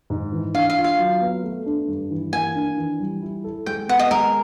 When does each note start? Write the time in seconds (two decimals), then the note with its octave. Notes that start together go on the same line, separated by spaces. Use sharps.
0.10 G#2
0.32 E3
0.54 D4 F5
0.70 F5
0.76 F4
0.84 F5
0.99 F#3
1.21 B3
1.43 A3
1.66 D4
1.88 G2
2.11 E3
2.33 A#3 G#5
2.55 D4
2.77 E3
3.00 G3
3.22 E4
3.44 A4
3.66 G#3 G5
3.89 B3 F#5
3.99 D#5
4.11 G#3 A#4